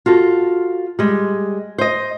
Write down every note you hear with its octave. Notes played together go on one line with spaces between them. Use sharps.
F4 F#4 A4
G3 G#3
C5 D#5